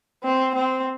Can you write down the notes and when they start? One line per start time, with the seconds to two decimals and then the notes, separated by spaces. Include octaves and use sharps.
0.24 C4
0.55 C4